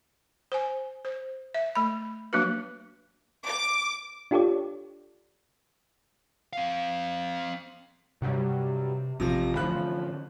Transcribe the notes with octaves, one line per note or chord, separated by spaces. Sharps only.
C5 G#5
C5
E5
A3 B5
F#3 A#3 D4 F#4 B4
D6
D4 F4 G4 A4 C#5 D5
C4 F5
G2 C3 F#3 G3
A1 C3 F3 A#6
A2 D3 E3 F3 C#4 B5 F#6